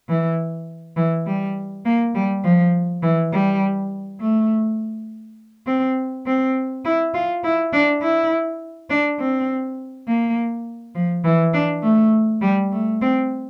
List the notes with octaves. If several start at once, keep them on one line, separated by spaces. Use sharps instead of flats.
E3
E3
G3
A#3
G3
F3
E3
G3
A3
C4
C4
E4
F4
E4
D4
E4
D4
C4
A#3
F3
E3
D4
A3
G3
A3
C4